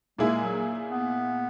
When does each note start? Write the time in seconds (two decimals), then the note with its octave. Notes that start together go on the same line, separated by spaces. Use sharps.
0.18 A#2 G#3 A#3 E4 G#4
0.44 F#3
0.92 B3